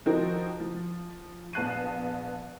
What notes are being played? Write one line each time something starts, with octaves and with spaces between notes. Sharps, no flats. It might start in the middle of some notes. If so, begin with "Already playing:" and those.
D#3 F3 C4 D#4 F#4 A#4
F3
A#1 B3 A5 F#6 C7 D#7